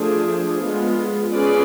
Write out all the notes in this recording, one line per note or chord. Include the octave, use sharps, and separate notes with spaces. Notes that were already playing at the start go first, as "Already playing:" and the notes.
Already playing: F3 A3 D4 G#4
G#3 B3 F4
C#4 F4 G#4 B4 D5